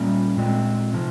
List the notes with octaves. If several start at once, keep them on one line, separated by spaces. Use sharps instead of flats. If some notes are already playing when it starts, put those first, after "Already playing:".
Already playing: A#2 G3 A#3 C#4
A#2 G#3 C4
C3 F3